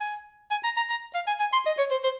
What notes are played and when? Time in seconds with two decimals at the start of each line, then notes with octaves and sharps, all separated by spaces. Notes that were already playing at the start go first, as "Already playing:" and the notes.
0.01 G#5
0.51 G#5
0.64 A#5
0.76 A#5
0.90 A#5
1.14 F5
1.27 G#5
1.40 G#5
1.53 C6
1.66 D#5
1.78 C#5
1.91 C5
2.04 C5